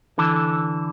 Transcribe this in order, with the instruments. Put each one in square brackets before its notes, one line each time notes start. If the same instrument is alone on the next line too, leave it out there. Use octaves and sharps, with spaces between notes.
[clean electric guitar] D3 E3 A4